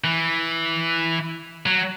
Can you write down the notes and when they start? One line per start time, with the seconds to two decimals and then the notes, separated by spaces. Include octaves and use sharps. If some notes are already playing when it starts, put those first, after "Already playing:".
0.04 E3
1.66 F#3